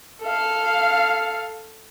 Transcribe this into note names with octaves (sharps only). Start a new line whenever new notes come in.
A4 F5